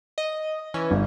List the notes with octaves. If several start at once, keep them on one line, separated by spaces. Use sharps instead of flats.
D#5
E3 C#4
G1